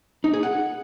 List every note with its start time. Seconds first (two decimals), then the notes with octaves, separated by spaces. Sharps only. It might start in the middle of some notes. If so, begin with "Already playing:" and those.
0.24 D#4
0.33 G#4
0.43 F#5